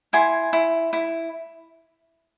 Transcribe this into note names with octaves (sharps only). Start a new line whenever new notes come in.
E4 G#5 C6
E4
E4